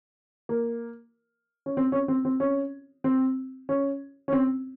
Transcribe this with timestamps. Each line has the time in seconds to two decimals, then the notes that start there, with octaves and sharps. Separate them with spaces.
0.49 A#3
1.66 C#4
1.77 C4
1.92 C#4
2.08 C4
2.25 C4
2.40 C#4
3.04 C4
3.69 C#4
4.28 C#4
4.33 C4